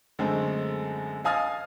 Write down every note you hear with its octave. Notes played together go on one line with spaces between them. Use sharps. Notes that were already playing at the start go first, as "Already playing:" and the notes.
F#2 D3 G#3 A3 C4
D#5 F5 G#5 D#6 F6 A6